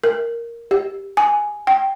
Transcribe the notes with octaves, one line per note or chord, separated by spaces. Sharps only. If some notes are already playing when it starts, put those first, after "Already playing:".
A#4
G4
G#5
G5